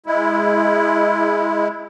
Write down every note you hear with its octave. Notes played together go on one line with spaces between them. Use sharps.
G#3 E4